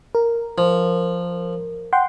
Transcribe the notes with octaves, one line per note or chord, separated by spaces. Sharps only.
A#4
F3
F#5 G5 C6